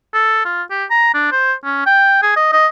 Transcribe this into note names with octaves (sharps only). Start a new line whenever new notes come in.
A4
F4
G4
A#5
D4
C5
C#4
G5
G#4
D#5
D#5